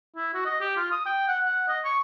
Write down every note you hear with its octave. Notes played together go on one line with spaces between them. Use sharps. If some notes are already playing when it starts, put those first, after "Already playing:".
E4
F#4
D#5
G4
F4
D#6
G5
F#5
F#5
D#5
C#6